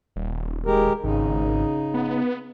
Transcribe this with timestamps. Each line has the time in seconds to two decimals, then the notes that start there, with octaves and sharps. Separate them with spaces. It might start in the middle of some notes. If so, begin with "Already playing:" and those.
0.16 D#1
0.66 G#3 G4 A#4
1.04 G#1 C#3 D#4
1.94 B3